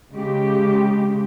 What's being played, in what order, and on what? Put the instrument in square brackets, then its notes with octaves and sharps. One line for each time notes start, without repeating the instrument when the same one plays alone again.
[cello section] C#3 G#3 G4